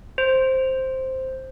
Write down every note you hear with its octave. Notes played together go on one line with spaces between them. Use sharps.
C5